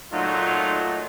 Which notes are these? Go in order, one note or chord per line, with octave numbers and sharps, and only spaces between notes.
A#2 F#3 A3 D#4 F4